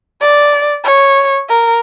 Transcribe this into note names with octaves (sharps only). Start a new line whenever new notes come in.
D5
C#5
A#4